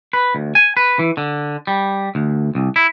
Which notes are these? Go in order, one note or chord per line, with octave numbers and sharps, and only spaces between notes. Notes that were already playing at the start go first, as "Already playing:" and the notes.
B4
D2
G#5
B4
E3
D3
G3
D2
C2
E4